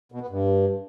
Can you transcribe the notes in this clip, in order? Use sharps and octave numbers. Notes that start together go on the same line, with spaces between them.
B2
B3
G2